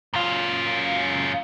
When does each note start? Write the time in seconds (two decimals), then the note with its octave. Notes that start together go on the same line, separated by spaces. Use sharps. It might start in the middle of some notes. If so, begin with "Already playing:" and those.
0.14 F#2 F4